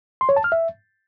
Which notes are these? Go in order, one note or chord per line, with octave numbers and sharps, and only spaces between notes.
C6
C#5
A5
F6
E5